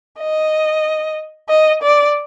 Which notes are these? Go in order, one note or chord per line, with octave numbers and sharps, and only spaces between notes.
D#5
D#5
D5